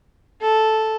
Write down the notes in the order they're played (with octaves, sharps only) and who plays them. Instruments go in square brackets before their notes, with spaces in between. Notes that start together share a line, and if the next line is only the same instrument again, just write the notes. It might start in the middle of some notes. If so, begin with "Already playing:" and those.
[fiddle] A4